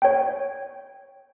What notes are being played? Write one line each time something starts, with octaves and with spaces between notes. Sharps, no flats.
C#5 G5